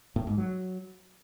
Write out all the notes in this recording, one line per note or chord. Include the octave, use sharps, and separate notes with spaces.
A2
G#2
F#3